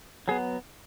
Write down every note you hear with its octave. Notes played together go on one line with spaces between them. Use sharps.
F#3 B3 G#4